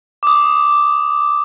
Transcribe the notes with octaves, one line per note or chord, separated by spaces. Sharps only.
D6 D#6